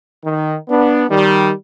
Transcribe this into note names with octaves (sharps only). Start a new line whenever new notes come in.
D#3
B3 D4
D#3 G3